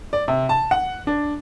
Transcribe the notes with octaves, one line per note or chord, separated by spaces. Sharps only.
D5
C3
A5
F#5
D4